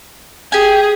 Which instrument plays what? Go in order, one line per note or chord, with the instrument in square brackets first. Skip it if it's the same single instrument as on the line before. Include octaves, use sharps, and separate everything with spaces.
[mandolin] G4 G#5 [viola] G#4